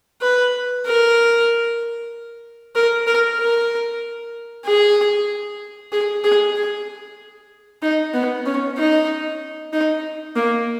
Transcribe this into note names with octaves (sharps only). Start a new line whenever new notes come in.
B4
A#4
A#4
A#4
A#4
G#4
G#4
G#4
G#4
D#4
B3
C#4
D#4
D#4
A#3